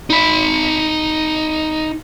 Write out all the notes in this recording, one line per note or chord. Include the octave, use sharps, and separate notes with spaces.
D#4 B5